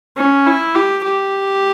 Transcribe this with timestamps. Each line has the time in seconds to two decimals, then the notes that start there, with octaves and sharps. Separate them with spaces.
0.17 C#4
0.47 E4
0.75 G4
1.04 G4